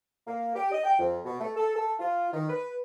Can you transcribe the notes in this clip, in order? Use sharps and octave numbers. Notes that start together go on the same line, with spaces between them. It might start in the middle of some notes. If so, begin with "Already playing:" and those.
A#3
G4
D#5
G5
F2
B2
A3
A4
A4
F4
D#3
B4